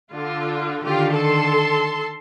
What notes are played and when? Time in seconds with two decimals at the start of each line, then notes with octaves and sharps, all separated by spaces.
0.13 D3 F4
0.84 D3 D#3 F4 G4
1.14 A4 A5 C6